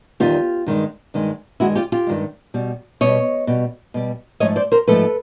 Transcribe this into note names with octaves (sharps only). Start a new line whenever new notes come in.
E2 C3 D#3 G3 F4 G4
G2 D#3 G#3
G2 D#3 G#3
G2 D#3 G#3 E4 F#4
F4 G4
F4 G4
G2 D#3 G#3
B2 G3
B2 G3 C#5 D#5
B2 G3
B2 G3
G#2 F3 A3 C#5 D#5
C5 D5
A#4 C5
G#2 F3 A3 A4 B4